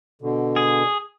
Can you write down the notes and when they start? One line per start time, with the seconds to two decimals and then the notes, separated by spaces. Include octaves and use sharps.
0.22 B2 D3
0.56 G#4